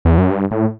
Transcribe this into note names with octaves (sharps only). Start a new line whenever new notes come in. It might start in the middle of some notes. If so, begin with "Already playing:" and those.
E2
F#2
G2
A2